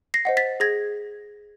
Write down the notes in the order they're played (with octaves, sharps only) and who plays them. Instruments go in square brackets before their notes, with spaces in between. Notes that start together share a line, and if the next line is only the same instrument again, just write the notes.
[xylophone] A#6 C7
C5 D#5 F#5
A6 B6
G#4 G#6 A#6